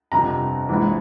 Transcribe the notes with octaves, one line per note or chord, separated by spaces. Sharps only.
G1 F2 C3 A#5
A#1 G#2 E3